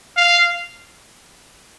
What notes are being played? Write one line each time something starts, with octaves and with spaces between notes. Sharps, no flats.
F5